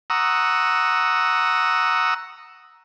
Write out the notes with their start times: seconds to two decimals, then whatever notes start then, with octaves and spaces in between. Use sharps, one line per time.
0.10 F#5 A#5 C#6 D#6 E6